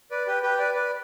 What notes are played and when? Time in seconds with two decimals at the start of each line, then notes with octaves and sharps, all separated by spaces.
0.11 B4 D5
0.27 G4 B4
0.42 G4 B4
0.59 B4 D5
0.75 B4 D5